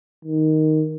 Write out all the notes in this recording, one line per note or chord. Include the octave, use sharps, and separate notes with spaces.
D#3